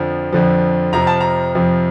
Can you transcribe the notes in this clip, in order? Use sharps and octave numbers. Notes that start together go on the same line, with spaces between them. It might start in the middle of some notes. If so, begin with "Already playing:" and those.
Already playing: F2 D3 F3
F2 D3 F3
F2 C3 F3 A#5
A5
A#5
F2 C3 F3